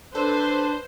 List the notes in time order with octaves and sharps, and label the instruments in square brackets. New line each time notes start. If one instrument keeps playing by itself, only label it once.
[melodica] D4 [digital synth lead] A4 [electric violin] B4 [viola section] C5